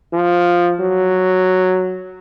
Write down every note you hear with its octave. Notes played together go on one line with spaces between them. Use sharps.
F3
F#3